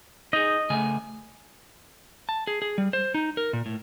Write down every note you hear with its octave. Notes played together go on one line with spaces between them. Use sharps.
D#4 G#4 D#5
C#3 A3 G#5
A5
G#4
G#4
G3
C5
D#4
A#4
A#2
A2